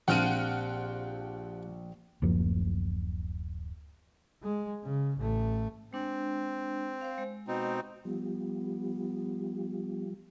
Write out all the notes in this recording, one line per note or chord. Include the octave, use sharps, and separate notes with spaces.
A#1 F3 C4 G4 F#5 F6 D#7
D1 F#2 F3 A#3
G#3
C#3
A1 A3
G#3 C4 D4
C5 F5
G#3
B2 C4 D#4
F3 G3 B3